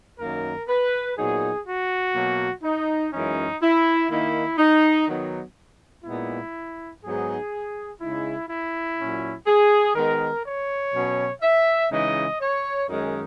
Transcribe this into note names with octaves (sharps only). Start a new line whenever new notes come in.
F#2 D#3 A#3 D#4 A#4
B4
A#2 F#3 B3 D#4 G#4
F#4
B2 F#3 A#3
D#4
F#2 E3 G#3 C#4 D#4
E4
D#3 A#3 D#4 E4
D#4
D#3 F#3 B3 D#4
A#2 G#3 B3 D#4 E4
G#2 F#3 B3 D#4 G#4
C#3 G#3 D#4 E4
E4
A#2 F#3 C#4
G#4
D#3 G#3 B3 A#4
C#5
B2 F#3 C#4
E5
C#3 E3 G#3 D#4 D#5
C#5
F#2 D#3 G#3 C#4 D#4